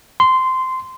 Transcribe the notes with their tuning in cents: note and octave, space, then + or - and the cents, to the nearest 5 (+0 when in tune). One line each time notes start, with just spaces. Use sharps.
C6 -15